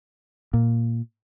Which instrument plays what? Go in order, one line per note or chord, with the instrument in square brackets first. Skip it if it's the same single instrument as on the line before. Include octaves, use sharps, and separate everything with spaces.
[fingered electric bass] A#2